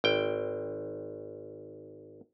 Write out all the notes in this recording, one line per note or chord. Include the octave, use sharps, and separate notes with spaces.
G#1 G5